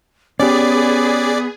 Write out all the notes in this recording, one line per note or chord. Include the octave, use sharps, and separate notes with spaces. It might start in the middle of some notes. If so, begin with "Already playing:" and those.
B3 C#4 G4 G#4 D5